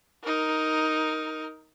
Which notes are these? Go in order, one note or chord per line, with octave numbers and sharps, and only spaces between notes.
D#4 A#4